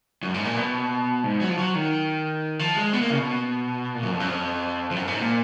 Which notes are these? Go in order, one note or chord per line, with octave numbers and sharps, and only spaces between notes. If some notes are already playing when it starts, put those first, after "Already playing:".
F#2
G#2
A#2
B2
G#2
F#3
F3
F#3
D#3
F3
G#3
B3
A#3
C#3
B2
A#2
F#2
F2
F#2
F2
F2
F#2
G#2
A#2